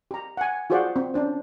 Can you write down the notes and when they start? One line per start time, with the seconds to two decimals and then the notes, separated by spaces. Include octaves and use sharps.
0.11 G4 A#5
0.37 F#5 G#5
0.70 F4 F#4 G#4 C5 D5 F#5
0.96 C4
1.14 C#4 D4 C5